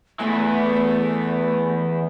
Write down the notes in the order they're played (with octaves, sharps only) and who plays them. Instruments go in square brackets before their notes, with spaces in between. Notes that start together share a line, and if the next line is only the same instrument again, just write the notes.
[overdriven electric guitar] E2 E3 [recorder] A3